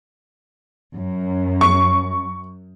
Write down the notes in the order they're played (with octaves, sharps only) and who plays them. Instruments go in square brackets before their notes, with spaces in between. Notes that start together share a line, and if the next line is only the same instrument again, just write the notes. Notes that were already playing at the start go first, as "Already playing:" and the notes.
[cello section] F#2
[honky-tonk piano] C#6